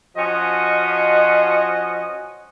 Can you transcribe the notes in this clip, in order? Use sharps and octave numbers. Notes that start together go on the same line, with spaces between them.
F3 C#4 F#4 D#5